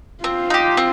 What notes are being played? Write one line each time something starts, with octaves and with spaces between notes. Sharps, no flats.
C4 F4
D#4 G4
C4